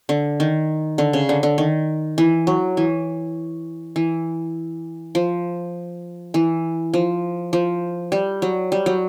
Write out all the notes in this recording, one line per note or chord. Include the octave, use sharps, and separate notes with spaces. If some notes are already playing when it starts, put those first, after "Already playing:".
D3
D#3
D3
C#3
D3
D3
D#3
E3
F#3
E3
E3
F3
E3
F3
F3
G3
F#3
G3
F#3